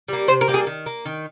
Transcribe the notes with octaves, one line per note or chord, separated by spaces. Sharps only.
G3 A#3
C3 C5
A#4
G3 A#3
G#4
D#3
A#3
D#3